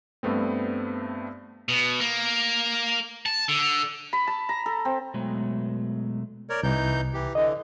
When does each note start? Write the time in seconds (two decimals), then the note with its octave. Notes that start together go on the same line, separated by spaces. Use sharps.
0.23 G2 A3 B3 C4
1.69 B2
2.00 A#3
3.26 A5
3.49 D3
4.13 B5
4.27 A5
4.49 A#5
4.66 A4
4.85 C4
5.14 B2 F#3 G#3 A3 B3
6.50 A#4 C#5 D5
6.63 C2 E3 D#4 G6
7.14 E3 G4
7.35 D3 E3 D#5